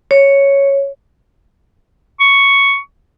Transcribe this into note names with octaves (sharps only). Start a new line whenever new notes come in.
C#5
C#6